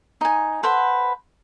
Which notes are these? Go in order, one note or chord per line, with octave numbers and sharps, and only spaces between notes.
D#4 G#5
A4 B4 C5 F#5